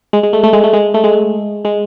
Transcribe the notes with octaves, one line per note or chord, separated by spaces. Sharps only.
G#3
G#3
A3
A3
G#3
A3
G#3
A3
G#3
G#3